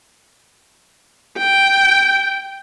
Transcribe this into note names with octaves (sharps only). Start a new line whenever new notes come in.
G5